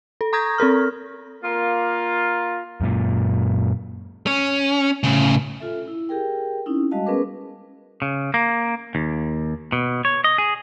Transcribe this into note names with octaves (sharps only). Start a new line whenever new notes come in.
A4
A#5 C#6 D#6 G6 G#6 A#6
C4 A4 A#4 F6
A#3 F4
F#2 A#2
C#4
A2 C#3
F4 A4 E5
E4
G4 G#4 A#4 G5
C4 C#4 D#4 E4
G3 G#3 F#4 D#5 F5 A5
B3 C#4 G#4 A#4 B4 D6
C#3
A#3
D#2
B2
C#5
D#5
G#4